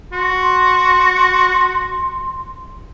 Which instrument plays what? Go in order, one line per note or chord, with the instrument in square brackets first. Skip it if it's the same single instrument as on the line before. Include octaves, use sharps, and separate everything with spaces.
[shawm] F#4 [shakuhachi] C6